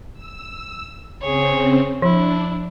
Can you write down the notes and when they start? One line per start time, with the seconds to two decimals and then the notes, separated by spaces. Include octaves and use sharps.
0.13 E6
1.21 C#3 C4 G#4 C#5
2.02 F3 D4 E4